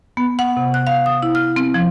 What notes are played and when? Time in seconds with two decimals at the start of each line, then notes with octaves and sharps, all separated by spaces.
0.17 B3
0.39 F#5
0.57 C3
0.74 F#6
0.87 F5
1.06 D#6
1.23 E4
1.35 F6
1.56 C4
1.74 F3